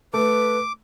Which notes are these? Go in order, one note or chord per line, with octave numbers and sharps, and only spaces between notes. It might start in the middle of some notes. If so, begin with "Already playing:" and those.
A3 B4 D6